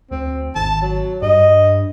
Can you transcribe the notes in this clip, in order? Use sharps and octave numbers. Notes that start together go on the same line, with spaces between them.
D2 C4
G#1 A5
F#3
G2 D#5